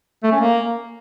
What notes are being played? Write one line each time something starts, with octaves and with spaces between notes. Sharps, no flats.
A3
C#4
A#3